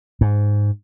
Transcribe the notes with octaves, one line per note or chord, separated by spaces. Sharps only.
G#2